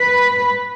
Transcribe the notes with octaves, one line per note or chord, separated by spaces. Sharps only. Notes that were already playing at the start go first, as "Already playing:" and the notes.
Already playing: B4